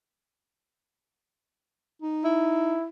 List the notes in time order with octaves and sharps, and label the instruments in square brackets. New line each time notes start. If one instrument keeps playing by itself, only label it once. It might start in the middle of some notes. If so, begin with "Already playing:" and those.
[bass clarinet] D#4
[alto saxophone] E4